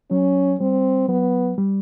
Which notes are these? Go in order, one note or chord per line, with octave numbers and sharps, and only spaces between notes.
F#3 C#4
G3 C4
F#3 B3
G3